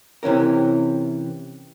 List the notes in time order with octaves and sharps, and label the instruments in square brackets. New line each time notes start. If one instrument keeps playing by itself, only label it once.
[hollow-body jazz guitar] C3 E3 C#4 A#4